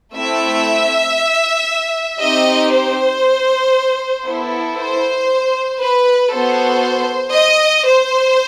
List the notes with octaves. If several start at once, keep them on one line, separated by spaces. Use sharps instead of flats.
A3 C4 E4 E5
C4 D#4 G4 D#5
C5
B3 E4 A4
C5
B4
B3 F#4 A4 C5
D#5
C5